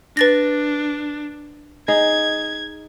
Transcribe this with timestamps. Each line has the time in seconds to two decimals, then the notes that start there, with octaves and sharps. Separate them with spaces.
0.17 D4 B4 A6 A#6
1.88 D#4 G#4 G#6